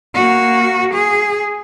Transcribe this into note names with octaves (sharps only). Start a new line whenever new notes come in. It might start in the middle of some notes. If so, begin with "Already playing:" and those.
A#3 F#4
G#4